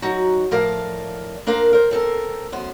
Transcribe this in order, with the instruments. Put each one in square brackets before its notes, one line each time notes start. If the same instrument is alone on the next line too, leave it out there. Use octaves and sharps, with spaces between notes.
[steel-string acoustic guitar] F#3 D#4 F#4
A2 F3 A#4 D5 F5 A5
A#3 D4 A#4 C5 F5
A#4 C5
C4 A4 A#4
F#2 B3 C5